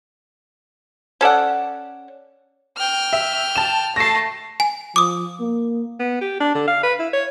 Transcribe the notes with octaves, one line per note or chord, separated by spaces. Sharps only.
C#4 A4 D5 F#5
G5 F6
E5
A5 E7
A3 A5 A#6 C7
G#5
F3 D6 D#6
A#3
B3
G4
D4
D3
F5
B4
E4
C#5